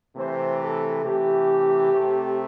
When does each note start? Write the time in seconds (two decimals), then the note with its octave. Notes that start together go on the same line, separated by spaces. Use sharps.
0.16 C3 E3 A3 C5
0.61 A4
1.03 C3 E3 A3 G4
1.90 C3 A3 C4